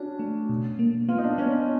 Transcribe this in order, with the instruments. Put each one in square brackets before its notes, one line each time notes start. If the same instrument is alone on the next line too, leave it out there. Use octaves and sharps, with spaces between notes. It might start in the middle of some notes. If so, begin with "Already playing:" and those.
Already playing: [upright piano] C#4 D4 [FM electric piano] F#4
[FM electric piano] A3
B2
A#3
[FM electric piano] B3 [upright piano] F4
[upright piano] D#4
D4
[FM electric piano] B3 [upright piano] C#4
[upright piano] C#4